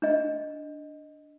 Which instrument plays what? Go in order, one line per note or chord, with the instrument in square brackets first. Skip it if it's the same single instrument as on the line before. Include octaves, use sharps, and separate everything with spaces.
[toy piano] D4 D#5